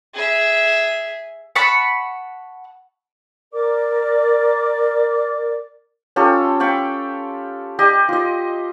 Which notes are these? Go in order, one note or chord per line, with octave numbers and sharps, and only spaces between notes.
G#4 E5
F#5 A5 B5 C#6
A#4 D5 D6
C#4 F4 G4 A4
F5 G5 B5 C#6
G4 D5 D#5
F4 D#5